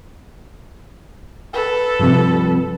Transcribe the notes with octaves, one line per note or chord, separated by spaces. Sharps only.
A4 B4
G2 C3 F3 G3 C4